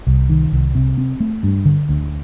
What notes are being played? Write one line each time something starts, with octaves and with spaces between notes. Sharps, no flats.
C2
D#3
C2
C3
C4
A3
G2
D3
D2